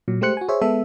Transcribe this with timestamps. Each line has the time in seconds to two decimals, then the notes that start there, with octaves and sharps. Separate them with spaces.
0.08 A#2 F#3
0.21 G#3 A3 G4 C5 F#6 C#7
0.37 F#4 G#5
0.48 G#4 C5 C#5 E5
0.61 G#3 B3 A4 E5